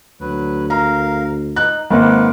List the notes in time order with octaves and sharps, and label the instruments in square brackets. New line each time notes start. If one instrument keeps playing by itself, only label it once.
[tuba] D2 [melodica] F#3 B4
[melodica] A#4 F5 [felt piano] A#5
[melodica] D#4 [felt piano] F#6
[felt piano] G#1 [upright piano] A#3 C4 [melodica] B4 F#5 D6